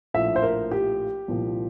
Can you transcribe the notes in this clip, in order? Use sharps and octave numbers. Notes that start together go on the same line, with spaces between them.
A#1 A2 F3 E5
C5
A#4
G4
C2 A#2 F3